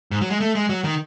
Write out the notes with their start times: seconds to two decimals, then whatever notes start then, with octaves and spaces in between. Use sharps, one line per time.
0.11 G#2
0.21 F#3
0.30 G#3
0.40 A3
0.55 G#3
0.69 F#3
0.84 D#3